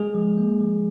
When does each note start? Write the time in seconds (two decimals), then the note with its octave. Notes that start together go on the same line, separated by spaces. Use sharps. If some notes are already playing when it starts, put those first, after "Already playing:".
Already playing: G#3 G#4
0.15 F3
0.38 A#3
0.60 F3